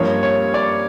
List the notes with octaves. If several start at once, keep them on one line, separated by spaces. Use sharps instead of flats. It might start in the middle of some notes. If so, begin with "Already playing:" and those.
Already playing: G2 F3 A#3 C#5
C#5
D5